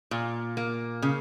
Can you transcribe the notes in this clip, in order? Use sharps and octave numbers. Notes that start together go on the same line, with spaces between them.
A#2
A#3
C#3